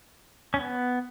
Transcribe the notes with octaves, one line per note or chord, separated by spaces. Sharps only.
C#4
B3